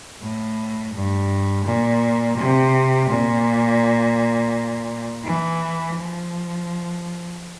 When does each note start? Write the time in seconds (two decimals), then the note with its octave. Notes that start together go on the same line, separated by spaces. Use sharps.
0.21 A2
0.94 G2
1.66 A#2
2.37 C3
3.09 A#2
5.24 E3
5.96 F3